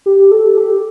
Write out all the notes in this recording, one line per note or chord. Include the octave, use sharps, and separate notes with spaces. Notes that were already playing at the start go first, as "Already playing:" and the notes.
G4
A4
G4